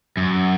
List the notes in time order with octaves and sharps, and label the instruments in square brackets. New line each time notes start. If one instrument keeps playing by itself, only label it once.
[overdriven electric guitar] F#2